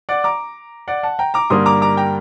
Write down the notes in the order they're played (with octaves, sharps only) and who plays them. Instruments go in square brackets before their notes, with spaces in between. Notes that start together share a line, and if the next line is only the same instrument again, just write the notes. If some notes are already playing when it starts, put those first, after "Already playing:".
[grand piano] D5 F#5
A#5 D6
D5 F#5
F#5 A5
G5 A#5
A#5 D6
G2 D3 G3 A#3 C6 D#6
A#5 D6
A#5 D6
G5 A#5